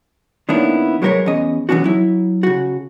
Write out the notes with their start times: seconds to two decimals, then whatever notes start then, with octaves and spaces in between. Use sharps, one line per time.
0.49 D#3 A#3 B3 C#4 D4 E4
1.02 F#3 G#3 G4 A#4 B4 C#5
1.26 E2 C#4 D#5
1.69 E3 B3 C#4 D4 F#4
1.84 F#3 E4
2.43 C#3 F#4